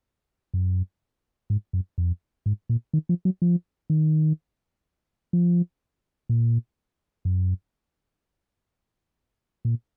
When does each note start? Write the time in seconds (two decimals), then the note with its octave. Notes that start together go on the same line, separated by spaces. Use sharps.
0.54 F#2
1.50 G#2
1.73 F#2
1.98 F2
2.46 G#2
2.69 A#2
2.93 D#3
3.09 F3
3.25 F#3
3.42 F3
3.90 D#3
5.33 F3
6.29 A#2
7.25 F#2
9.65 A#2